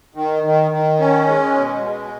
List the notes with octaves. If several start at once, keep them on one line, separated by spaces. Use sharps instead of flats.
D#3
D#3
D#3
C#4
G#3
B2
G#3